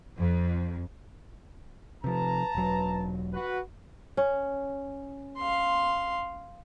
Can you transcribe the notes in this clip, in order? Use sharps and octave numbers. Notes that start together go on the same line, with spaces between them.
F2
C3 F3 B4 A5 A#5
E1 F#3
F#4 B4
C#4
F5 C6